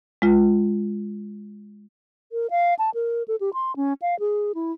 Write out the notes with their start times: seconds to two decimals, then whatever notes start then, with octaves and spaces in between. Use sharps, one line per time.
0.22 G#3 F4
2.32 A#4
2.51 F5
2.79 A5
2.94 A#4
3.28 A4
3.41 G4
3.54 C6
3.76 C#4
4.02 F5
4.20 G#4
4.55 E4